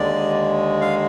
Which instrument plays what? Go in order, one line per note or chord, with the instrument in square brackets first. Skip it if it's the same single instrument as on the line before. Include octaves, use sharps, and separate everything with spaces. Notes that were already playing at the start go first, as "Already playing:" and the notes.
Already playing: [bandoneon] D#2 D3 G#3 D5
F5